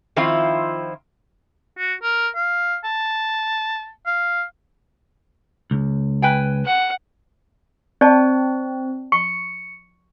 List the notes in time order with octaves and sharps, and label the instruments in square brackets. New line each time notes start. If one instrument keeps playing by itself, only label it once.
[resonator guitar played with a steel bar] D#3 F3 C4 E4 F4
[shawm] F#4
A#4
F5
A5
F5
[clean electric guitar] C#2
[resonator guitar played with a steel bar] B4 G5 G#5
[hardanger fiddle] F#5
[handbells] C4 [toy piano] D5 A5
[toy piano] C#6 [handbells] C#7